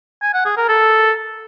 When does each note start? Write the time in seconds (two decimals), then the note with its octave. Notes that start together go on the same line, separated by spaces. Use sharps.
0.22 G#5
0.34 F#5
0.46 G#4
0.57 A#4
0.69 A4